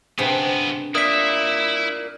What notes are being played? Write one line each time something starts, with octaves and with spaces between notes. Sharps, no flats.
G2 C3 B3 C4 G#4
E4 A#4 D5 E5 D#6 B6